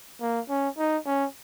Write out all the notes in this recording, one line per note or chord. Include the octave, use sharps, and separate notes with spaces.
A#3
C#4
D#4
C#4